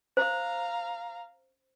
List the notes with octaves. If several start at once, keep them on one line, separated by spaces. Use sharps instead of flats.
C5 F5 A#5